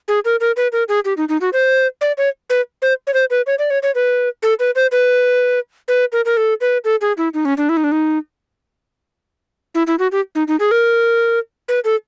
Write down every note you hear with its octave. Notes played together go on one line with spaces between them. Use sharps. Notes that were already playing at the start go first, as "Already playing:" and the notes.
G#4
A#4
A#4
B4
A#4
G#4
G4
D#4
D#4
F#4
C5
D5
C#5
B4
C5
C#5
C5
B4
C#5
D5
C#5
C#5
B4
A4
B4
C5
B4
B4
A#4
A#4
A4
B4
A4
G#4
E4
D#4
C#4
D4
E4
D#4
D4
D#4
E4
E4
F#4
G4
D#4
D#4
G#4
A#4
B4
A4